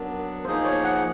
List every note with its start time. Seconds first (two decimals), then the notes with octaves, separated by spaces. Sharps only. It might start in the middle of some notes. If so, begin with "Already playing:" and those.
Already playing: F#3 B3 D4 A#4
0.45 F3 A#3 D#4 G#4 C5
0.65 C#5
0.84 F#5